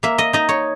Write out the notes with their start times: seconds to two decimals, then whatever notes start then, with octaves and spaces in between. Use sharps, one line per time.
0.03 A#3 E5
0.18 D#5
0.33 D#4 D#5
0.49 C#5